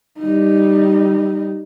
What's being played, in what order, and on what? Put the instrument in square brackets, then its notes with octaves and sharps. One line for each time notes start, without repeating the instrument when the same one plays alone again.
[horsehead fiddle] G3 D#4